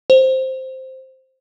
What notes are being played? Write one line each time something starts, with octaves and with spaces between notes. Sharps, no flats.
C5